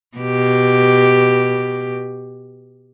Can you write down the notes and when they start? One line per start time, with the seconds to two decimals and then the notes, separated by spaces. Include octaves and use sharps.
0.17 B2 G4